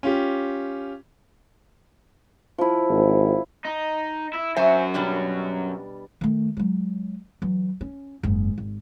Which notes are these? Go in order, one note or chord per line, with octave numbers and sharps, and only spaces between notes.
C#4 F4 G4
F3 E4
G#1
D#4
E4
F#2 F#4 C5 E5 G#5
B2 G3 D4
D#3 A3
F#3 G#3
E3 F#3
C#4
F#1 G#2
G#1